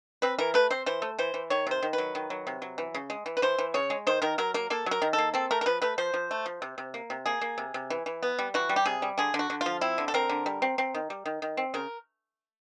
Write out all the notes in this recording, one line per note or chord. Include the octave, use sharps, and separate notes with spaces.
C4 B4
E3 A#4
A3 B4
C4 C5
E3 C5
A3
E3 C5
E3
D#3 C#5
C3 C5
D#3
B4
F#3
D#3
F#3
C3
F#3
E3
C#3
G#3
E3
B4
E3 C5
E3
C#3 C#5
G#3
D#3 C5
D#3 A#4
F#3 A#4
A#3 A#4
A#3 A4
F#3 A#4
D#3
A4
A#3
C4 A4
A3 A#4
A#4
F3 B4
A3 B4
F3 C5
F3
A3
F3
C3
C3
A#3
C3
A#3 G#4
A#3
C3
C3
E3
E3
B3
G3
E3 F#4
G3
G4
C3 G#4
G3
D3 G#4
D3
F#4
D3
F4
F3
C4 E4
D3
A4
C4 A#4
D3
G3
C4
C4
D#3
G3
D#3
D#3
C4
C#3 A#4